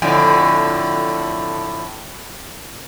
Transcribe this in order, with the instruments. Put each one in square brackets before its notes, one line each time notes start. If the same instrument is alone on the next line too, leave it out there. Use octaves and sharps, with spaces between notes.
[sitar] F2 A2 D3